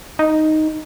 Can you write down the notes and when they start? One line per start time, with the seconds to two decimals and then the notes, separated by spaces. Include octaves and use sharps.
0.19 D#4